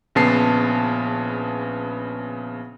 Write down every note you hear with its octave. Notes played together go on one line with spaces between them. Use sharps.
A#1 C#3 B3 A5 C7